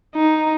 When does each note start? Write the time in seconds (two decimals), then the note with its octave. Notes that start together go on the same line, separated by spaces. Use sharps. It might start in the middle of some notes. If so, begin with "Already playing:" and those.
0.15 D#4